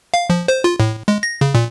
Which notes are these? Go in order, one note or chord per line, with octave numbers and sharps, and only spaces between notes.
F5
F3
C5
F4
A2
G#3
A#6
C#3
A#2